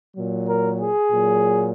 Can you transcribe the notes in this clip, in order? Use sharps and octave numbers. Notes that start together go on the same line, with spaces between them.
A#2 F#3
A#4
G#4
A#2 F#3